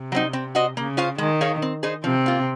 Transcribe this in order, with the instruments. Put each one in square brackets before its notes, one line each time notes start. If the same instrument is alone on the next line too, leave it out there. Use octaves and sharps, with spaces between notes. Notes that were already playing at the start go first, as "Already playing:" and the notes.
Already playing: [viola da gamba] C3
[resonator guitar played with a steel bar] F#3 C4 D#4
C4
F#4 C5 D#5
[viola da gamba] C#3 [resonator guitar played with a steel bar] A#3
[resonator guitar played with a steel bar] C#4 F4 C5 F5
[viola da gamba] D#3 [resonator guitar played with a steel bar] G#3
[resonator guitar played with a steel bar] D#4 G#4 C#5 F5
C4
D#4 G#4 C5
[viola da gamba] C3 C4 [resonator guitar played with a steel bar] F3
[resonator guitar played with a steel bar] A#3 F4